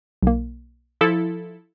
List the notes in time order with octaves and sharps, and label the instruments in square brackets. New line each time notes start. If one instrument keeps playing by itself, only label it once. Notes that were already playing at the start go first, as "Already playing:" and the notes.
[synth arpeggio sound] B1 A#3
[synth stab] F3 E4 A4